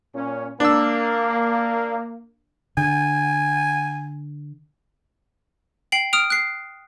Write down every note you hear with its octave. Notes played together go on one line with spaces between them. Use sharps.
A#2 C#4
A#3 D4 E6
D3 G#5
G5 C7 F#7
D#6 F6 D7 F7
F#6 C7